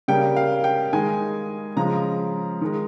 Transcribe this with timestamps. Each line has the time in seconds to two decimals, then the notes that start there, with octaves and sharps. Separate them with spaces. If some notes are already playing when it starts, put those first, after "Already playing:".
0.08 C#3 G3 A#3 G5
0.36 F5
0.64 G5
0.93 D#3 G#3 G#5
1.76 C#3 F3 G#3 A#5
2.61 D#3 G#3